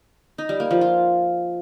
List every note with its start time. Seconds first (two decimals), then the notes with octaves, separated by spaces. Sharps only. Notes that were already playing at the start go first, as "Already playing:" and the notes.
0.38 D#4
0.49 G3
0.60 A#3
0.71 F3
0.81 F4